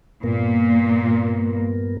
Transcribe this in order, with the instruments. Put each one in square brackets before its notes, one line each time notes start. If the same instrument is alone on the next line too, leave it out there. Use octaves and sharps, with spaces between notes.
[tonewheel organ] G2 B3 A#4 [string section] A#2